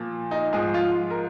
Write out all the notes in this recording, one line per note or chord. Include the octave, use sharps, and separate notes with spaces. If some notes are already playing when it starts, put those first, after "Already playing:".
Already playing: A#2 F3
D#4
G#2 F3 G#4
F4
A#4